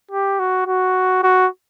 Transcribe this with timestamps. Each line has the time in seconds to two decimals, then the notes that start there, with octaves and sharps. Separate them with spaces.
0.11 G4
0.39 F#4
0.67 F#4
1.23 F#4